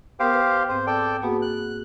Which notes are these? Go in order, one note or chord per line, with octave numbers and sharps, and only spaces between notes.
B3 G4 A#4 C5 F5 D#6
B4
G#2 C4 C5
A4 D5 G5
A#3 B3 F#4 G#4
F#6